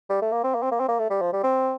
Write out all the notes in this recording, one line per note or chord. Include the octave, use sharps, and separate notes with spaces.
G3
A3
A#3
C4
A#3
C4
A#3
C4
A#3
A3
G3
F3
G3
C4